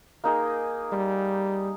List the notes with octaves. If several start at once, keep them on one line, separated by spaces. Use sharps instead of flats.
A#3 D#4 G#4
G3